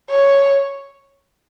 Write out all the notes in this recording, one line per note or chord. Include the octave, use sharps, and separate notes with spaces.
C#5